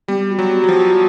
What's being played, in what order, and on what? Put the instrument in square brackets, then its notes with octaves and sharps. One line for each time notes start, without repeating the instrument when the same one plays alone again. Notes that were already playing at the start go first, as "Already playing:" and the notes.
[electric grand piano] G3 [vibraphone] B3
[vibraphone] F#4
[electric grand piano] F#3
[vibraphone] B3
[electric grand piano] F#3
F3
[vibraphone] F#4